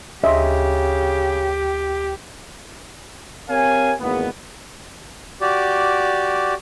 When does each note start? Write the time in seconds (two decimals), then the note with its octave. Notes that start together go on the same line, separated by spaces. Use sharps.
0.24 D2 C#3 G4 D#5 E5 C6
3.49 C4 G4 A#4 C#5 F5 G#5
4.00 G#1 E2 G#3 A#3 B3
5.41 F#4 G4 D5